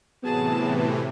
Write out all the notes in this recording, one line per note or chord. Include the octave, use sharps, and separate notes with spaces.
A2 C3 E3 F#3 B3 G#4 A5